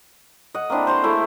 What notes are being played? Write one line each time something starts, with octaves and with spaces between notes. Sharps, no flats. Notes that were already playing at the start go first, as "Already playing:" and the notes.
D#5 F#5
A#3 C4 D4 E4
C5 A#5 C6 C#6
A3 E4 G#4